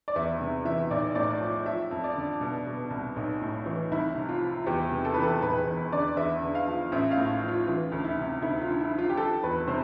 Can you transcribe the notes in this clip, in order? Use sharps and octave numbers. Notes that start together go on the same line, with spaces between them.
D5
E2 E5
C3
E3 E5
B1 D5
A2 D5
F3
F3 E5
F2
D5
D3
B2
B2
C2
B1
A2
E3
C2 E4
C3
F4
F3
E2 G4
C3
A4
E3 B4
A4
E1 B4
E2
D3 D5
E2 E5
D3
F5
F3
A1 E5
F5
A2
F3
F4
E3 F4
D2
E4
C3
D2 E4
F4
D3
E4
F3
F4
G4
F3 A4
E2 B4
C3 C5